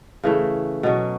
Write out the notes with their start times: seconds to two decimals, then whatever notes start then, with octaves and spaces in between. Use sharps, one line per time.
0.23 C#3 E3 A3
0.83 B2 F#3 C#4